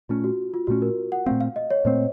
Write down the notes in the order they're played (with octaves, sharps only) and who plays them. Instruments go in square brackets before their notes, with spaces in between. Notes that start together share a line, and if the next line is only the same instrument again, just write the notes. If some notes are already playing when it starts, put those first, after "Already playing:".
[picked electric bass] A#2 A3 C#4 [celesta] F4
[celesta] F#4
F4
[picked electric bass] A#2 A3 C#4 [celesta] F#4
[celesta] A#4
F#5
[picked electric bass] A#2 A3 C4 [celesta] F5
[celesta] F5
D#5
C#5
[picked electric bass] A#2 A3 C4 [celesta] C5